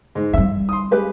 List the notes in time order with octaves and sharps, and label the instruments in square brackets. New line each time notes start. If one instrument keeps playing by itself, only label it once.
[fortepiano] G#2 G#3
[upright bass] G3 C4 [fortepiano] E5
[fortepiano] C6 D#6
G#3 G4 B4